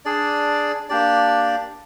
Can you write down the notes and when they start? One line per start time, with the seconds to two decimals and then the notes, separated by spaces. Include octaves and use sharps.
0.05 D4 G#4 D5
0.89 A#3 D4 G4 D5